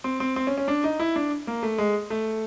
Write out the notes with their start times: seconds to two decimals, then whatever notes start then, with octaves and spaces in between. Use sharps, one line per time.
0.04 C4
0.20 C4
0.36 C4
0.47 C#4
0.58 C#4
0.68 D4
0.84 D#4
0.99 E4
1.16 D4
1.47 A#3
1.63 A3
1.78 G#3
2.10 A3